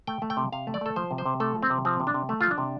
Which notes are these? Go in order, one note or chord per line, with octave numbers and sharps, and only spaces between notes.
A3 G5
A3
G5
C3
C3 F5
A3
D5
A3 A4
F3 C5
C3
C5
C3
A3 A4
F3
C4
C3
F3 C4
C3
D4
C3
A3
F3 F4
D4
C3